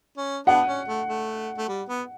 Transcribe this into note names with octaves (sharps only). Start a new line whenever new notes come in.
C#4
B3 D4 F#5
C#4
A3
A3
A3
G3
B3